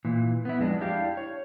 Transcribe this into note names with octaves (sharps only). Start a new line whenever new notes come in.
A#2 E3
B3 E4
F2 G#3 D4
D4 E4 G4 D5 F5
C#5